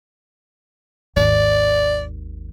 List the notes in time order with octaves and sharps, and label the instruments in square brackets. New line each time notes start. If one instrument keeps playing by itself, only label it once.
[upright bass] G#1 D#2 [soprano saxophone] D5